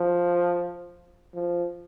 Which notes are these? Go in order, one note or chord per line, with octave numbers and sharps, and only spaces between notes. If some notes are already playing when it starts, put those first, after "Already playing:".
Already playing: F3
F3